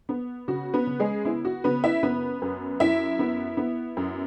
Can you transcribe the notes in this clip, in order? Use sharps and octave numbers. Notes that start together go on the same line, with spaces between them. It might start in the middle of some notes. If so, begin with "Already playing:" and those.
B3
C#3 F#4
B3 B4
C#3
G#3 G#4
B3 E4
F#4
C#3 B3 B4
E4 E5
F#2 B3 B4
F#2
F#2 E4 E5
B3
B3
F#2